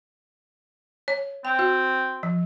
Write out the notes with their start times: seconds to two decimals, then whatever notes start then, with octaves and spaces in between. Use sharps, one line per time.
1.08 C#5
1.45 C4 G5
1.59 F#4
2.23 F3